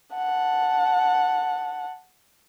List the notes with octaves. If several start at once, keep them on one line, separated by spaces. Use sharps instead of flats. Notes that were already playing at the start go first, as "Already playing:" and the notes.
F#5 A5